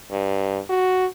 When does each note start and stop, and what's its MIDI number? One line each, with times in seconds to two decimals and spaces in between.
0.12 0.60 43
0.70 1.06 66